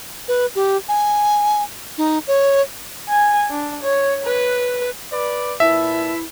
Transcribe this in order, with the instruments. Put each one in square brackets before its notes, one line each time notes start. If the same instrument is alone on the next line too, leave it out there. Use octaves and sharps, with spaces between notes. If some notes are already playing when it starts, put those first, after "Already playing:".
[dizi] B4
G4
G#5
D#4
C#5
[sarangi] G#5
D4
C#5
B4
[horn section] B4 D5
[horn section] A#2 B4 A5 [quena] E4 [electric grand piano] E5